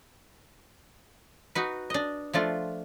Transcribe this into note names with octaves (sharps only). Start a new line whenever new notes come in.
D#4 F#4 B4
D4 D#5
F3 A3 D4 F4